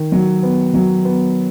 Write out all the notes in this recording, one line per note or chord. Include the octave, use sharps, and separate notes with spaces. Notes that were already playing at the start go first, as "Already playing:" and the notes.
Already playing: D#3
F#3
B3
F#3
B3